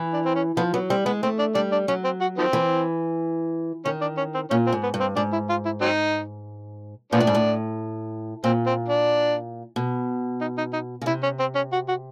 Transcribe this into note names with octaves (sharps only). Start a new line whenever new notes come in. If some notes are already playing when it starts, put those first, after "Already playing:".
Already playing: E3
D4
C4
C#4
F3 B3
F#3 B3
G3 C4
G#3 B3
A3 C4
D4
G3 D4
D4
F#3 C#4
C4
F#4
D#3 F3 C4
E3
D#3 C#4
D4
C#4
C4
A#2 C#4
C4
G#2
B3
G2
C4
G#2 D4
E4
F4
E4
F#3 C4 D#4
A#2 F3 B3 D4
A2
G#2
A2
A#2 C4
C4
D4
B2
D#4
D#4
D#4
C#3
C3 E4
C#4
C4
C#4
F#4
F#4